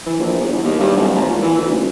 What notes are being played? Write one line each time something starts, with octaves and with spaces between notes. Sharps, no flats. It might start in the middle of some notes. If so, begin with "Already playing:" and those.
E3
A#1
G1
E2
D#2
G2
D1
G#1
A#2
E3
D2
D#1